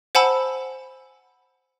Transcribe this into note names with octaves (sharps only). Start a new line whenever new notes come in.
C5 F#5 G#5 A5 B5 E6